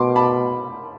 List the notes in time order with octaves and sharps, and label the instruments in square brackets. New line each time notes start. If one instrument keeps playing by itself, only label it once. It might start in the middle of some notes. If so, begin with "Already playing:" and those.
Already playing: [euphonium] B2 [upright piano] C6 D6
[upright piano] A5 B5